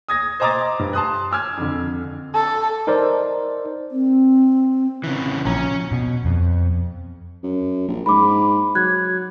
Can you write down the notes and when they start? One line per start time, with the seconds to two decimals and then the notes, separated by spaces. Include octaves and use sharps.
0.08 D#6 G#6 A#6
0.40 C5 D#5 A#5 D6 D#6 A6
0.79 G2
0.93 A5 C6 D#6 F#6
1.31 G#5 D6 E6 F6 G#6
1.57 F2 D3
2.35 A4
2.87 D#4 A#4 C5 D5
3.91 C4
5.04 C#3 E3
5.45 A#1 C#4 A#5
5.92 B2
6.25 F2
7.44 F#2
7.88 A#1
8.06 G#2 B5 D6
8.75 F#3 F#6 G#6